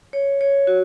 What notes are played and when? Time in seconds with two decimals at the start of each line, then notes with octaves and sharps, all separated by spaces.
0.13 C#5
0.41 C#5
0.67 F#4